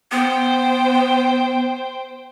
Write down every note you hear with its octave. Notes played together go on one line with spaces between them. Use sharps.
B3 C5 G5